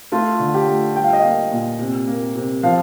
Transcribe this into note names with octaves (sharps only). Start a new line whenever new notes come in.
A3 F4
D3
G4
A3
G3 G5
F5
D#5
A#3 F5
A#2
C3
A#3
C3
F3 F5